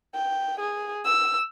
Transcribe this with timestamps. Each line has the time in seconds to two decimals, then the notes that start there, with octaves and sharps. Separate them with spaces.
0.15 G5
0.60 G#4
1.05 E6